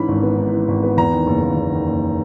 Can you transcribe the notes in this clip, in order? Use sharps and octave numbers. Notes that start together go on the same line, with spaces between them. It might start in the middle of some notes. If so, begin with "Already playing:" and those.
Already playing: G#2 E3 C#4 B5
G#1
B3
G#2
E3
G#1
B3
E2 A#5
D#3
F#1
F#1
E2
D#3
F#1